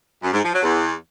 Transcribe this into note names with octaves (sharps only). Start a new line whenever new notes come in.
F#2
G#2
F3
F#3
E2